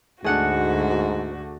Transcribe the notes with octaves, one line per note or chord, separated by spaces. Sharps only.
D2 G#2 A3 D4 F#4 G#4 F#5 C#7